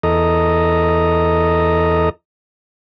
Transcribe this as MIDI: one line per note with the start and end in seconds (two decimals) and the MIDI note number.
0.03 2.09 40
0.03 2.09 69
0.03 2.09 75
0.03 2.09 82